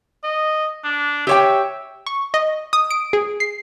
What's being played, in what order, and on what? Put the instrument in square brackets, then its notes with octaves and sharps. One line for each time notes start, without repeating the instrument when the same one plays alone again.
[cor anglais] D#5
D4
[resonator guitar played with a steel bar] G4 C#5 G5 [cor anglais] E5
[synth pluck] C#6
D#5
D#6
D7
G#4
C7